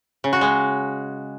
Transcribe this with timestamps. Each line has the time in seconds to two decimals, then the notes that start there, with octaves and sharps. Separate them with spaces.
0.24 C#3
0.33 F#4
0.41 G#3